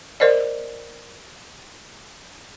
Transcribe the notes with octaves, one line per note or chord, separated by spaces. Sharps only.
A#4 C5 D5 D#5